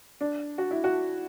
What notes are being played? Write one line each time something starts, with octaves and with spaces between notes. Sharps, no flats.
D4
F#4
E4
F#4